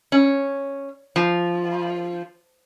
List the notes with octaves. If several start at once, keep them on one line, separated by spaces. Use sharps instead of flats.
C#4
F3